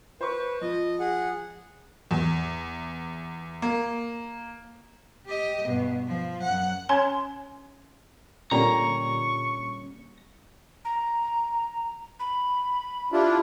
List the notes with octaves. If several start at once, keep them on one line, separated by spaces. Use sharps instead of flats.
B4 C5 C#6
F3 D#5
G#4 F#5
E2
A#3
G4 D#5
G2 B2
F3
F#2 F#5
C#4 C#5 G#5 A#5 C6
A#2 D3 G3 C#4 A#5 C#6
A#5
B5
D4 E4 F4 G4